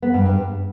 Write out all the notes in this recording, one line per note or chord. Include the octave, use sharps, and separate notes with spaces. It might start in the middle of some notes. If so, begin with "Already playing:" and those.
B3
G2
G2